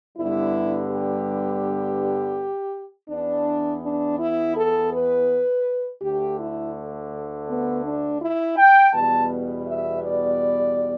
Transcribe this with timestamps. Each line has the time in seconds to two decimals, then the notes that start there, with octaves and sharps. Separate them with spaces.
0.18 G2 D3 G3 B3 E4
0.90 G4
3.09 E2 E3 B3 D4
3.83 D4
4.19 E4
4.55 A4
4.92 B4
6.01 D2 D3 A3 G4
6.38 E4
7.48 B3
7.83 D4
8.20 E4
8.56 G5
8.92 E2 B2 G3 B3 A5
9.66 E5
10.03 D5